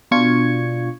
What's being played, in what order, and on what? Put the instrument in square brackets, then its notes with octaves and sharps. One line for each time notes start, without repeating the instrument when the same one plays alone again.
[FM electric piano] B2 D4 F4 C#6 G#6 C#7